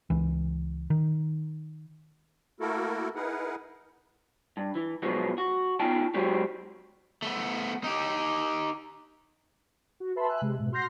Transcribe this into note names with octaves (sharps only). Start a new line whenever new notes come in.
C#2 E3
D#3
A3 A#3 E4 F#4 A4 A#4
D#4 E4 G#4 A#4 B4 F#5
G2
E3
B2 F3 F#3 G#3 B3
F#4
B3 D#4 F4 G5 A5
F#3 G#3 C4 F#4 G4
A3 B3
D#4 G4
F#4
A4 B4 E5 A5 B5 C6
E5 G#5 E6 F#6
C3 G#3
G#2 B2
F#4 C6 F6 G6 A#6 C7